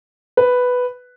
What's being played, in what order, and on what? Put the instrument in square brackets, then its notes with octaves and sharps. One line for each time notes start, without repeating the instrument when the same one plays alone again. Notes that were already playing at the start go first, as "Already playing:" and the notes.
[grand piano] B4